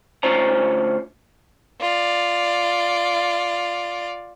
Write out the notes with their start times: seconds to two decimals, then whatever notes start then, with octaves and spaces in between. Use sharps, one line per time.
0.23 D2 C#4 F4 C5 C#5 A#5
1.81 F4 D5